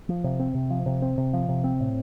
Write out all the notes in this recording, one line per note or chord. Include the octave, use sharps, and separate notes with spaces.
F3
C3
C4
C3
F3
C3
C4
C3
F3
C3
C4
A2